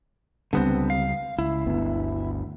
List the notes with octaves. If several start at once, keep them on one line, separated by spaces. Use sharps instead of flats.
C#2 D3 G3 B3 C4
F5
C#2 E4
G1 D2 B3